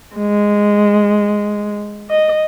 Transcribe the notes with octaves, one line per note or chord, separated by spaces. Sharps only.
G#3
D#5